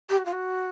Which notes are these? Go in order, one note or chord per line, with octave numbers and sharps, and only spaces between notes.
G4
F#4
F4
F#4